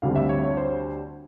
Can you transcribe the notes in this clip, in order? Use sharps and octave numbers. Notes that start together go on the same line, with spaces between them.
D2 D3 G3 C4 F5
E5
C#5
C#5
C5